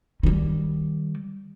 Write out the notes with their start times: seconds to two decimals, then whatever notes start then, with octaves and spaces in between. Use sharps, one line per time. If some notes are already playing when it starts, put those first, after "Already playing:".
0.23 D#3 G3